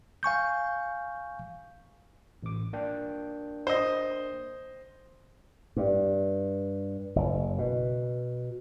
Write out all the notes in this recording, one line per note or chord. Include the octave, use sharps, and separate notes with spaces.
F5 G#5 C#6 G6
A1 D6
A#3 D4 G5
C5 D#5
G2
F#1
B2